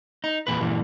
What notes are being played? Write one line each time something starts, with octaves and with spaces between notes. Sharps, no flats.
D#4
E2 A#2 B4
G2 A#2 E3